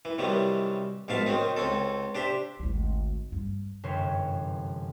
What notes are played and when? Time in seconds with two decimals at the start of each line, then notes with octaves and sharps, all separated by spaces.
0.05 E3
0.18 C3 D#3 E3 F#3 G3
1.08 A#1 G#2 B2 E5 F5 A5
1.26 D#3 F#3 C4 D#4
1.57 C#2 C4 C#4 A4
2.15 D4 G4 C5 E5
2.59 G#1 D2
3.32 G2
3.83 G1 F#2 C3 E3 C5 C#5